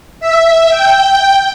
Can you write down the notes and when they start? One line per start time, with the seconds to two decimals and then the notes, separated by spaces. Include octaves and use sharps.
0.20 E5
0.69 G5